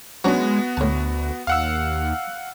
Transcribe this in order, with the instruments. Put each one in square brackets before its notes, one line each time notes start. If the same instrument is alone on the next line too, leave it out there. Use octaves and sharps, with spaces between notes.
[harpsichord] F#3 C#4 D4 [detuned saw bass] G#3 [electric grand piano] B3 F#4
[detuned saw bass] D2 [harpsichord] A2 A5
[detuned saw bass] D#2 [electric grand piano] F5 F#5 E6